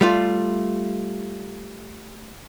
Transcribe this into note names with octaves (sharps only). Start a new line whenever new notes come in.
G3 A3 F4